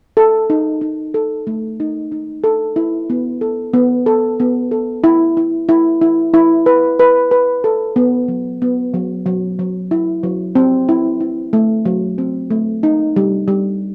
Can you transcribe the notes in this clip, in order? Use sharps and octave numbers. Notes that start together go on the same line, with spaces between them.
A4
D#4
D#4
A4
A3
D#4
D#4
A4
E4
B3
A4
B3
A4
B3
A4
E4
E4
E4
E4
E4
B4
B4
B4
A4
B3
F#3
B3
F#3
F#3
F#3
E4
F#3
C4
E4
E4
A3
F#3
C4
A3
D#4
G3
G3